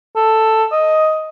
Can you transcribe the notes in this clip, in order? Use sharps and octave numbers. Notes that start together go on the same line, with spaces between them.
A4
D#5